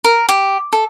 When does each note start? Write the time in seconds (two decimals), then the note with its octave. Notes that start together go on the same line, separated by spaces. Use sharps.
0.04 A#4
0.29 G4
0.73 A4